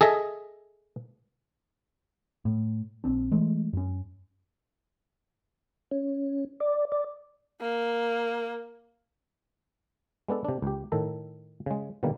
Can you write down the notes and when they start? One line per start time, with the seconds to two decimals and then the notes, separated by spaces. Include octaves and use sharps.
0.01 G#4 A4 D#5 E5
2.45 A2
3.04 A#1 C4 D4
3.32 E3 G#3 A3
3.73 F#2 C#4
5.91 C#4
6.60 D5
6.92 D5
7.61 A#3
10.28 G#3 B3 D4 A4
10.45 C3 D4
10.62 C#2 G4
10.92 A2 D#3 A4 A#5
11.66 C#3 G#3
12.03 B2 D3 D#3 G3 A#3